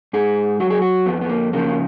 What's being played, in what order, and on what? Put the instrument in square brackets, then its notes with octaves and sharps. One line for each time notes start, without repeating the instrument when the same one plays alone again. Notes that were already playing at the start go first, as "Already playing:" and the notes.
[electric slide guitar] G#2 G#4
F#3 F#4
G#4
F#4
F2 B3
B3
A#3
C#3 F3 A#3